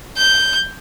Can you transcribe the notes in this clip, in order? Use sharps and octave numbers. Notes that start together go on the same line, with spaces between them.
G6